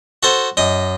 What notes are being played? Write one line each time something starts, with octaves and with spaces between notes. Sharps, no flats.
F#4 A4 C5
F#2 D#5